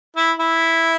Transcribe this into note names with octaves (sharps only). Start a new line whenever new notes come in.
E4
E4